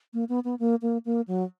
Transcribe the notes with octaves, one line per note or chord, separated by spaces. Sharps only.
A#3
B3
B3
A#3
A#3
A#3
F#3